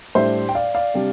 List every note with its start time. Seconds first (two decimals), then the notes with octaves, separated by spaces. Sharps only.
0.15 A2 G3 D4 C5 E5
0.49 G5
0.55 D5 F5
0.75 D5 F5
0.94 C3 G3 D4